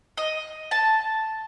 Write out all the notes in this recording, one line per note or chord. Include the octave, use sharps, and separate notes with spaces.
D#5
A5